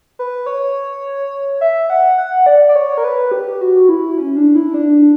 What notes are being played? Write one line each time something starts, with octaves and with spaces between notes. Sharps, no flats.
B4
C#5
E5
F#5
F#5
D5
D5
C#5
A#4
B4
G4
F#4
E4
C#4
D4
E4
D4